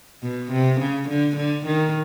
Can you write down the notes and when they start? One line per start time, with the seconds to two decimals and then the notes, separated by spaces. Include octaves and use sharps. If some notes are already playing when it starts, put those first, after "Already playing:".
0.22 B2
0.52 C3
0.80 C#3
1.09 D3
1.37 D3
1.66 D#3